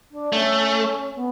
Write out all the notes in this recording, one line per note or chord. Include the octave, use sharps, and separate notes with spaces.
D4
A3 C#4
B3